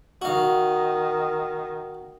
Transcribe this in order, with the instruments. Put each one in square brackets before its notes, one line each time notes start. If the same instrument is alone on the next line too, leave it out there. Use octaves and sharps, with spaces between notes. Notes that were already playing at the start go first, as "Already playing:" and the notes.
[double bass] D#3 [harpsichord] F#4 F5